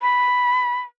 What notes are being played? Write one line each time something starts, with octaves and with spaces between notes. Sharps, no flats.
B5